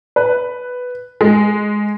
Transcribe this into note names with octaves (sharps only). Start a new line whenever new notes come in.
B4
G#3